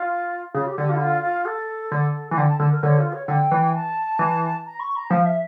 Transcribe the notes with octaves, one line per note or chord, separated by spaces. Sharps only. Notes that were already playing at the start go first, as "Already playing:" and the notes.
Already playing: F4
C#3 F4
G4
D3 G4
F4
E4
F4
F4
A4
D3
E3
D3 G5
A5
D3 A5
A#4
D3 C#5
F4
C#5
D3 G5
E3
A5
E3
A#5
C#6
A#5
F3 F5
E5